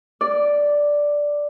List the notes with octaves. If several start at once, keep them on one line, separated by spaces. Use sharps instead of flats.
D5